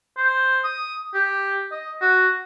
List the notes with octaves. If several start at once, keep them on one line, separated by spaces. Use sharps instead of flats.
C5
D#6
G4
D#5
F#4